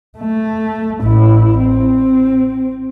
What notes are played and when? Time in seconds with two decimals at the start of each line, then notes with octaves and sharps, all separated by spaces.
0.18 A3
1.02 A1 E4
1.59 C4